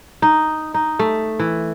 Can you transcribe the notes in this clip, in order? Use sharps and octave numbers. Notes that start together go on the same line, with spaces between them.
D#4
D#4
A3
E3